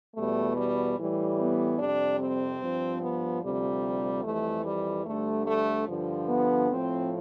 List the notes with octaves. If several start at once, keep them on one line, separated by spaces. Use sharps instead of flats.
E2 B2 G3 A3
G3
A2 E3 G3
B3
F2 C3 G3 D4
C4
G2 F3
B3
D2 C3 F3 G3
F2 E3 G3 A3
G3
D2 D3 G3 A3
A3
G2 D3 F3
B3
A2 F3 C4